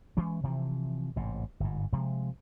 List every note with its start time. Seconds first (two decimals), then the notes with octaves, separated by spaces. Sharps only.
0.17 E3 G#3 C#4
0.43 C3 E3 F3
1.16 A1 G#2 C3
1.60 G1 G#2
1.93 C3 F3 G#3